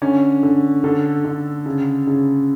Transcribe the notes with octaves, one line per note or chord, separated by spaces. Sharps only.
D3 C#4
D3
D3 A4
D3
C#3
C#3